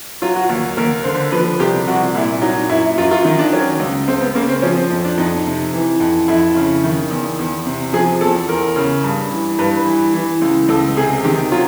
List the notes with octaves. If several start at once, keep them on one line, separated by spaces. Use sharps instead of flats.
F#3 F4
F#4
D#2
D#2 A#4
D3 C5
F3 B4
C2 G4
C2 F#4
A#2 E4
F#3 D#4
F#2 E4
F#2 F4
F4
D#3 D#4
D4
F#3 C#4
C#2
C#2 C4
B3
C#3 A#3
C4
F3 C#4
C4
F2
D4
F2 D#4
C3
E3
F2
F2 E4
C#3
D#3
E2
E2
C3
F3 G#4
E2 A4
E2 A#4
C#3
G2
E3
G2 B4
E3
E3
C#2
C#2 A4
C3 G#4
D#3 G4
F#3 F4